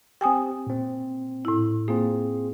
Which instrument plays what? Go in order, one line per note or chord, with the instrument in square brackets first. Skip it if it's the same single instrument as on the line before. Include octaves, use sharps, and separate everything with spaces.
[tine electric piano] C4 G4 [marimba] G5 G#5 D#6
[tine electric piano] A#2 C4
[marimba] A2 E4
[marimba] A#3 [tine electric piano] C4 F4 G#4